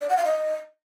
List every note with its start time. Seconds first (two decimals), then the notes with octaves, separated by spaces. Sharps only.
0.01 D5
0.09 F#5
0.17 F5
0.25 D#5